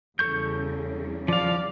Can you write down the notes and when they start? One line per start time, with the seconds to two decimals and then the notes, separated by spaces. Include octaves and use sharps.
0.19 E2 C#3 G3 A4 C#6 G6
1.28 F3 D5 F5